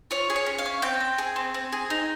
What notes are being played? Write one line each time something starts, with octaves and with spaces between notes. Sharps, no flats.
F4 C#5
G#4
C#5
C#4
F5
C#4
C4 G5
C4
G#4
C4
C4
G#4
D#4